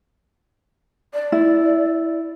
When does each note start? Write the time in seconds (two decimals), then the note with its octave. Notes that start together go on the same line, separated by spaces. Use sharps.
1.14 D5
1.32 E4